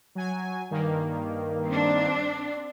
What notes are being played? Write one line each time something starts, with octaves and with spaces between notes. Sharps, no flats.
F#3 G#5
G2 D#3 A#3
C4 D4